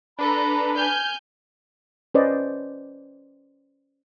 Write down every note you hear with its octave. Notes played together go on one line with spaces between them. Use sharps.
D4 A4 B4 A#5 B5
G#5 F6 G6
C#4 B4 C5 D5 D#5